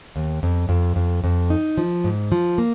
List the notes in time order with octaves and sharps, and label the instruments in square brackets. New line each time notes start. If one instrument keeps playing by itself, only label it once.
[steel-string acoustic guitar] D#2
F2
F2
F2
F2
D#4
F3
G#2
F3
A#3